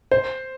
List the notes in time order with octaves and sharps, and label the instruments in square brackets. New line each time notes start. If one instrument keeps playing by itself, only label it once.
[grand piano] C5